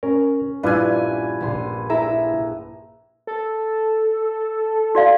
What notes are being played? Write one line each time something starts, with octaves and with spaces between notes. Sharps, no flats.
C#4 A#4
A#1 G2 D4 E4 F4 B4 G#5
A#1 C6
E4 G#4 E5 A#5
A4
F#4 D5 F5